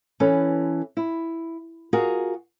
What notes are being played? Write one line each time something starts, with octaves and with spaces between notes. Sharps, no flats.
E3 C#4 A4 B4
E4
F4 F#4 G#4 A#4